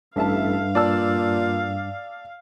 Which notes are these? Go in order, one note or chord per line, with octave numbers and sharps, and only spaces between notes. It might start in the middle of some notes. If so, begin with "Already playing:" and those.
A1 G2 A4 E5 F5 A5
A#2 D5 A5 E6